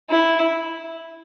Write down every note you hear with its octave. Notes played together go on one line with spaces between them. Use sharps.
E4